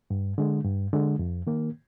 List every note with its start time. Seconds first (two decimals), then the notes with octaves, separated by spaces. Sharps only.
0.10 G2
0.38 D3 G#3
0.65 G2
0.93 D3 G#3
1.19 F2
1.47 D#3 A#3